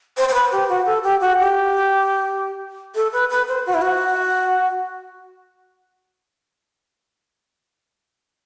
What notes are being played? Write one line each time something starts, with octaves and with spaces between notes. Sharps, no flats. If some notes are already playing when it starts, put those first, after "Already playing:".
C5
C5
B4
G4
F#4
A4
G4
F#4
G4
A4
B4
B4
C5
F#4
E4
F#4